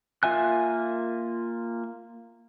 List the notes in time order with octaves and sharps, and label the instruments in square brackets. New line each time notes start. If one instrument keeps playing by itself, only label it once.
[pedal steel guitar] A#3 F4 E5 G#5 F#6